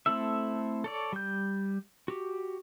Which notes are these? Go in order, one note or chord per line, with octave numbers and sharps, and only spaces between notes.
A3 C4 E4 A4 E5
A4 C#5 D5
G3 G6
F#4 G4